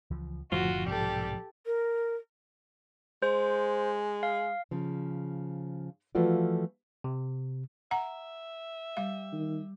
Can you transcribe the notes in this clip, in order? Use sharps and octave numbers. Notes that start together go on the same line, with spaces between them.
C#2 E3 F3
F#1 A2 D3 F3 F4 F#4
B1 G#2 C3 G3 G4 A4
A#4
G#3 C5
F5
C#3 F3
E3 F3 A3 F4 F#4 D5
C3
E5 F#5 A#5
G3 F5
D#3